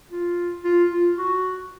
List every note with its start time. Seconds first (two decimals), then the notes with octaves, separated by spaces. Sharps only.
0.11 F4
0.64 F4
0.91 F4
1.18 F#4